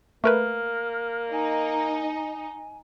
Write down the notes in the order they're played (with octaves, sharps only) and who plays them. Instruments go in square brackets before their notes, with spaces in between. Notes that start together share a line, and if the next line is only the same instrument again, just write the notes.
[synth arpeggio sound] A3 A#4 B4 [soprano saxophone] A#3 [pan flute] F6
[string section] D#4 [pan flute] G#5